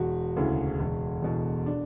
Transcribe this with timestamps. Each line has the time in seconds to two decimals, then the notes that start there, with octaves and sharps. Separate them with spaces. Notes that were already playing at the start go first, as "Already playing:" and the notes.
Already playing: E1 F#4
0.36 D2 C#3 E3
0.80 E1
1.22 E2 B2
1.66 D4